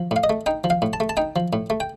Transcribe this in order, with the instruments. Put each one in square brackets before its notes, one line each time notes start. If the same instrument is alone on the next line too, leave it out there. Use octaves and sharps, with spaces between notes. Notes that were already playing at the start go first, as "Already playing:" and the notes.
Already playing: [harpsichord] F3
A2 F5
D#5
A3
D#4 G5
F3
F5
A2
A5
A3
A5
D#4 G5
F3
A2
A3
G5